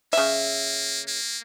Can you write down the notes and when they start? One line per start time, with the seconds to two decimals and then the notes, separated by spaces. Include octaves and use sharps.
0.13 C#3 A#3 E5
1.08 A#3